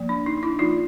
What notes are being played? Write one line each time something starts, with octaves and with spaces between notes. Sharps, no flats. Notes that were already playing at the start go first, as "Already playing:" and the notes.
Already playing: F3 A#3
D4
D#4
D#4
D4 E4
F3 A#3 D4 D#4 F4